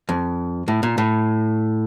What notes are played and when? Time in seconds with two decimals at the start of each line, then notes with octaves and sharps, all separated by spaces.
0.09 F2
0.68 A2
0.83 A#2
0.98 A2